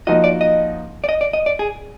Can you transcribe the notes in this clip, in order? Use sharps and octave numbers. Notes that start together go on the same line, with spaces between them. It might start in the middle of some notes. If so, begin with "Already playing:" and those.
F3 A#3 D#4 F#4 D#5
D5
D#5
D5
D#5
D5
D#5
D5
G#4